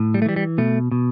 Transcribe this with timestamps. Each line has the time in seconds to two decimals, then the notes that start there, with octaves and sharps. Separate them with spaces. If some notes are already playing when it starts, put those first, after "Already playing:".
Already playing: A2
0.14 G3
0.22 A3
0.26 E3 G3
0.36 G3
0.58 B2 A3
0.92 B2